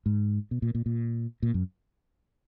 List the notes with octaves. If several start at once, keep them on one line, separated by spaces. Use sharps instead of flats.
G#2
B2
A#2
A#2
A#2
A#2
F#2